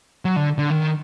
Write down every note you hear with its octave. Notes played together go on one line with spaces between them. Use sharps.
F#3
D3
D3
D#3